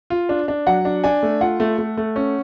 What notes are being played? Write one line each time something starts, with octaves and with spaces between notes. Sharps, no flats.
F4
D4
D4
F#3 F#5
D4
D4 G#5
A3
F4 F#5
A3
A3
A3
C#4